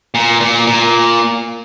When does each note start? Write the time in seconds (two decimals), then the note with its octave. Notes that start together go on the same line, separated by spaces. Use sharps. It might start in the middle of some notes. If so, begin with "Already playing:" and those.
0.14 A#2
0.41 A#2
0.67 A#2